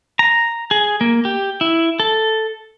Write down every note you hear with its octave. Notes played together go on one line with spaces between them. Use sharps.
A#5
G#4
A#3
G4
E4
A4